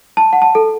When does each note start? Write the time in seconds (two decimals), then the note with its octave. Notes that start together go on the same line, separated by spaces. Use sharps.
0.17 A5
0.33 F#5
0.42 A5
0.55 A4